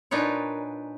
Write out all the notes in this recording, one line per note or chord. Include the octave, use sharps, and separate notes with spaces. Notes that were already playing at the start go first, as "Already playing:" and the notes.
A#2 D4 D#4 B4 C#5